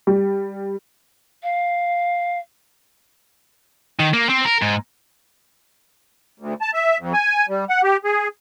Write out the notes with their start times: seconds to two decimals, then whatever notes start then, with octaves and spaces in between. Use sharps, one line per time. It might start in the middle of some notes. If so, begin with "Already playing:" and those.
0.07 G3
1.43 F5
3.99 D#3
4.13 A#3
4.29 C4
4.45 A#4
4.62 G#2
6.40 D2
6.61 A5
6.74 E5
6.99 F2
7.14 G#5
7.49 G3
7.69 F#5
7.83 G4
8.05 G#4